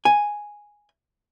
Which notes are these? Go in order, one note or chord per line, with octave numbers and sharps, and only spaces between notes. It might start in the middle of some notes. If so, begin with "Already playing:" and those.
G#5